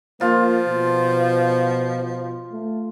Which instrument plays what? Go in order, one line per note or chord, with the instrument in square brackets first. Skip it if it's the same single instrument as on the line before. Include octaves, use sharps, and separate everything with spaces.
[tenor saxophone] F3 [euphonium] A#3 [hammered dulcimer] F4
[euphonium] B2
A3